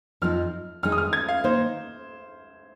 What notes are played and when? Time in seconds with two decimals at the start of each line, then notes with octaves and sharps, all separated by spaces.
0.22 F2 F3 C4 D#4 F6
0.83 F2 D#3 G#3 D#4 F6
0.92 D#6
0.98 F6
1.13 G#6
1.29 F5
1.44 D#3 A#3 D#4 C5